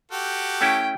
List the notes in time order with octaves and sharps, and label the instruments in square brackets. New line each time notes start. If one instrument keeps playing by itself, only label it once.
[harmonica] F#4 G4 A4
[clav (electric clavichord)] A3 C#4 E4 [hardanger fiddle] G5